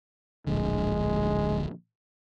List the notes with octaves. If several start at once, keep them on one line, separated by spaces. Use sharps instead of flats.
D1 A#1 D3 G#3